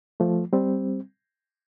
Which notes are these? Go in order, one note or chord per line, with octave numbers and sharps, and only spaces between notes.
F3 A3
G3 C4